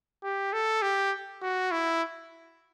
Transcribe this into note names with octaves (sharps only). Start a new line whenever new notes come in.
G4
A4
G4
F#4
E4